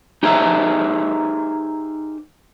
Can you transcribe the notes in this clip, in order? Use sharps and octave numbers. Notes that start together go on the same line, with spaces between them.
D#4 G4 G#4 A#4 C5 E5